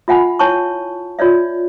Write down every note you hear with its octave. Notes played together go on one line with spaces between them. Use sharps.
F4 E5 F#5 G#5 B5
E4 C#5 G#5 A5 C#6
F4 C#5 D5 E5